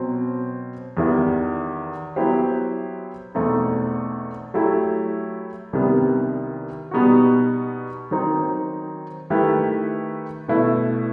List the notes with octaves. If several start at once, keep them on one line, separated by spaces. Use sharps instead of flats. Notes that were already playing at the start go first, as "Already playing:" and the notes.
Already playing: B2 F#3 C4
E2 D#3 G3 B3 E4
F#3 B3 E4 G4 C5
E2 B2 A3 C4 D#4
F#3 A3 E4 G4
C2 C3 D#3 G3 B3
B2 G3 B3 D#4 F#4
D#3 F#3 C4 D#4
D#3 A3 E4 G4 B4
B2 A3 E4 B4